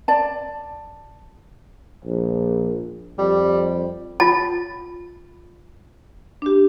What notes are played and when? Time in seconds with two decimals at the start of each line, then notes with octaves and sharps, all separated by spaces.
0.08 D5 A5
2.05 A#1
3.18 F2 G3
4.20 F4 A5 A6
6.42 D4 G4